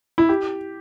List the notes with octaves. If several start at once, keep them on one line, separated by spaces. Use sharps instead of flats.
E4
G4